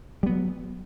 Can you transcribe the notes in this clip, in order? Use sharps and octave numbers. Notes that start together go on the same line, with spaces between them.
F#3 G3 B3